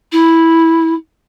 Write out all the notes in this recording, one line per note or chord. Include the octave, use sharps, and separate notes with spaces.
E4